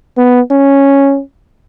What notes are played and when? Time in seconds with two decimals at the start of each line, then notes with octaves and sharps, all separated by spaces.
0.17 B3
0.51 C#4